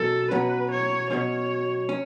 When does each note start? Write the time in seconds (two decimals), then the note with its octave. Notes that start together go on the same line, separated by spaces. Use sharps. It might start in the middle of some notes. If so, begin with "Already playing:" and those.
Already playing: B2 F#3 C#4 A4
0.31 B2 F#3 C#4 B4
0.71 C#5
1.10 B2 F#3 C#4 C#5
1.89 C#4